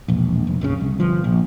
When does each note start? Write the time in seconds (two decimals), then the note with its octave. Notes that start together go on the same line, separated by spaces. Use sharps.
0.08 E1 A#1
0.47 F1
0.61 F1 A#1 C#3
0.81 C2
1.00 G1 F3
1.24 A#1